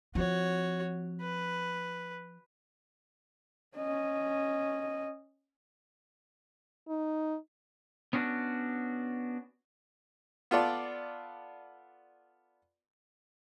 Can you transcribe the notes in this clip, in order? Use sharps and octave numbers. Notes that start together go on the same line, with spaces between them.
F3 C4 F#4 C#5
B4
C#4 D#5
D#4
B3 C#4 D4 F#4
B3 F4 A4 D5